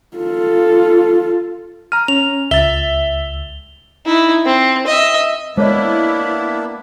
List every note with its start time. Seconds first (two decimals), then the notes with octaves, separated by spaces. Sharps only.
0.17 F4 A4
1.92 A#5 F6 D#7
2.08 C#4 F7
2.51 C#2 E5 A6 G7
4.06 D#4 E4
4.46 C4
4.87 D#5 E5
5.57 G#3 A#3 B3 D4 E4 C5 C#5 D#5